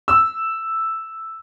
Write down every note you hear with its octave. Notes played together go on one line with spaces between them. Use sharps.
E6